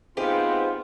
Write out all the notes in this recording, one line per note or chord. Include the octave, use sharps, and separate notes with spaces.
G#2 B3 C4 F4 G4 B4 F5